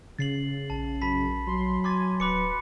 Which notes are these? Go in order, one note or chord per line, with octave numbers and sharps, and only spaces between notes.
C#3 A6 C7 F#7
A#1 A5
F#2 A5 B5 B6
F#3 C6
G#5 C6 D6 A6
D1 B4 B5 D6 C#7